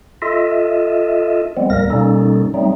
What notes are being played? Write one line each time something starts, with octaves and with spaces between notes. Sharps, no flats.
F4 A4 D#5 E5
F3 G3 G#3 B3 C4
D#2 A2 G3 A#3 A#4 A#6
B2 G3 A#3 C#4 D#4 A4
F#3 G3 A3 C4 D#4